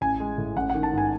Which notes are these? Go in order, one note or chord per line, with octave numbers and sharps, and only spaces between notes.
A1 G#5
G#3
A2
A1 F#5
F#5
D#3
A5
G#2 G#5